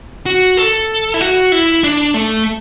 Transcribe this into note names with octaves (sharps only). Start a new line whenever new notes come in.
F#4
A4
E4
F#4
E4
D4
A3